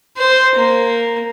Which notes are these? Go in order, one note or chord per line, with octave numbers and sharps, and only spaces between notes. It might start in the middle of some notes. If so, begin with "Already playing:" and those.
C5
A#3